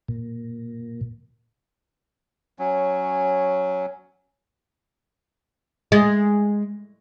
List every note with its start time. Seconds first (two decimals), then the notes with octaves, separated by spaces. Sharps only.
0.08 A#2
2.59 F#3 C#4
5.92 G#3